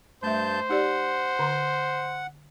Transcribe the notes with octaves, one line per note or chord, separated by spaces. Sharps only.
G2 A3 C5 E5 A5 G6
D#4 G4 D5 F#5
D3 A#5 C6